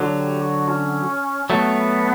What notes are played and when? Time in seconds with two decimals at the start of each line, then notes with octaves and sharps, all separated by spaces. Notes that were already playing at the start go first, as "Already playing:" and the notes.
Already playing: D3 F#3
0.14 G4
0.41 F#4
0.68 C#4
1.50 F#3 A3 B3